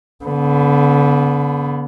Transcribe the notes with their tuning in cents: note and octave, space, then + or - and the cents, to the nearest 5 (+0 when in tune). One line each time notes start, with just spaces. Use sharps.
D3 -35 B3 +0